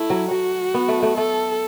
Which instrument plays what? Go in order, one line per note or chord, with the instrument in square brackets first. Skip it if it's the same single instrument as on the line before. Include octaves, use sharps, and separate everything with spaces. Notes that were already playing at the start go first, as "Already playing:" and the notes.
Already playing: [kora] A3 [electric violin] E4
[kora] F#3
[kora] F#3 [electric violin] F#4
[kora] B3
A3
A3
[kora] A3 [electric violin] A4